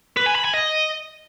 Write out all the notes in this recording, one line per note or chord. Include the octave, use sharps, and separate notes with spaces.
B4
G#5
B5
G#5
D#5